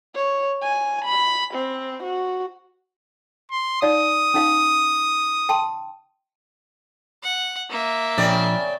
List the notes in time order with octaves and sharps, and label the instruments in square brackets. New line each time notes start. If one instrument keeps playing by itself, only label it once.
[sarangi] C#5
G#5
B5
C4
F#4
[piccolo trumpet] C6
[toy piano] D#4 D5 F5 [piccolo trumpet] D#6
[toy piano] C#4 D#4 F5
G5 A5 C6
[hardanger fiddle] F#5
A#3 E5
[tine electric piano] A#1 [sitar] C#3 C4 D5